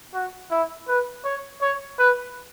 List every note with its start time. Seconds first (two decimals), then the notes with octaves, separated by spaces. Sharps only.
0.14 F#4
0.51 E4
0.88 B4
1.24 C#5
1.61 C#5
1.99 B4